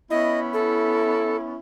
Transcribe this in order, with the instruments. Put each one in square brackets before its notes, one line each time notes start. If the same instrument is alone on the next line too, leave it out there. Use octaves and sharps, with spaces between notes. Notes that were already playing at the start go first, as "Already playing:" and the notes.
[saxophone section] B3 C#4 E4 [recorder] D#5
[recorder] A4